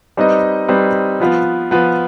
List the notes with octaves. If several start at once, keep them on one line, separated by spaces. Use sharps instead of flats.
G3 C4 D#4 B4 D#5
G3 C4 D#4 B4 D#5
F3 B3 F4 B4
F3 B3 F4 B4